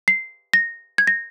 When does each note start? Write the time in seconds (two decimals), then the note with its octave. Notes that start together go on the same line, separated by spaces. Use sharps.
0.08 C7
0.53 A#6
0.98 G#6
1.07 A#6